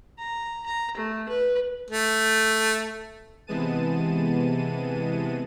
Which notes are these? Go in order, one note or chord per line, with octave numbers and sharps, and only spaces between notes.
A#5
A#5
A3
B4
A3
C3 E3 G#3 B3 A5 D#7